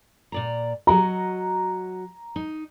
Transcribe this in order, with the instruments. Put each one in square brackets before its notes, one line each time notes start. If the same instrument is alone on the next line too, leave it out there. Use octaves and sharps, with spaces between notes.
[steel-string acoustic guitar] A#2 D5 A#5
[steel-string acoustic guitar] F#3 F#4 D#5 [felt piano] A#5
[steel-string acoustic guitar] D#4